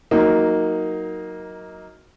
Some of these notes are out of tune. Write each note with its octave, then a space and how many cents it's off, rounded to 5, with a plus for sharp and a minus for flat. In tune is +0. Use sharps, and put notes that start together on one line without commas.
F#3 +0 A#3 +0 D#4 +20